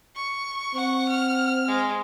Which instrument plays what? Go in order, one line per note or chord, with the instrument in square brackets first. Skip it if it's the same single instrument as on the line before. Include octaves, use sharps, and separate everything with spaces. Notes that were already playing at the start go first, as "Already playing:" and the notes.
[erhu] C#6
[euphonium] C4 [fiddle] F#5
[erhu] F6
[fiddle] G#3